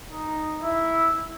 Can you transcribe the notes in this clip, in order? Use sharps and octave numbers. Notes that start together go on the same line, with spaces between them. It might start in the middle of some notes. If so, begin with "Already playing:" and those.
D#4
E4